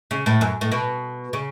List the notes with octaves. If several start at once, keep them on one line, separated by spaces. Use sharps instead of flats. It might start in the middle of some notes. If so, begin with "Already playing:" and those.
C#3
A2
F#2
A2
B2
C#3